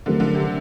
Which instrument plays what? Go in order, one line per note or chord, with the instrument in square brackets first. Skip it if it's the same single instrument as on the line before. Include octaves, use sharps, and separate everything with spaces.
[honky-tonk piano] D3 [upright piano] F#3 A3 C4 G4 A#4
[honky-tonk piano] D3
C3